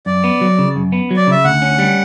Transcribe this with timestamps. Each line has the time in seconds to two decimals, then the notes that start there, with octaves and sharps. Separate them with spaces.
0.06 F#2 D5
0.24 B3
0.41 F#3
0.59 C#3
0.76 F#2
0.92 B3
1.11 F#3
1.17 D5
1.27 C#3 E5
1.45 D2 F#5
1.62 C#4
1.79 G3